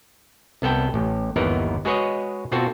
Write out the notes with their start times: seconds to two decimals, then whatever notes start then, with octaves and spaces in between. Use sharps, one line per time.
0.62 C2 B3 A4 G5
0.94 A1
1.36 G1 D#2 E3 B3 D#4 A#4
1.85 G#3 F#4 G#4 B4 C#5 D#5
2.52 B2 C4 F4 F#4 A4